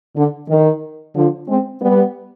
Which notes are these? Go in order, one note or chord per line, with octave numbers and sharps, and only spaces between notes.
D3
D#3
D3 F3
G#3 C4
G3 B3